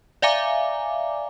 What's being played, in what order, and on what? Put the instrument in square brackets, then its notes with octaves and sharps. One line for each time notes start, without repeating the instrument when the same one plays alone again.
[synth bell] D5 E5 F5 G#5 A#5 D6